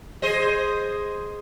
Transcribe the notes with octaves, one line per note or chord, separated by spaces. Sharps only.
G#4 C5 D#5